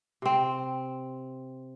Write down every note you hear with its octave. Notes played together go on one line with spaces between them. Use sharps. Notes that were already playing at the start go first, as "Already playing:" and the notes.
C3 C4